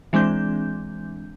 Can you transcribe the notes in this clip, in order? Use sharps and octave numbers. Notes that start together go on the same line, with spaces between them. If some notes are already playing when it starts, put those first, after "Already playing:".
E3 G#3 C4 D4 G6